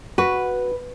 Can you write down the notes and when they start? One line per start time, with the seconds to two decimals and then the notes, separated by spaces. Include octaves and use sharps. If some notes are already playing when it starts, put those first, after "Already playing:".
0.18 F#4 B4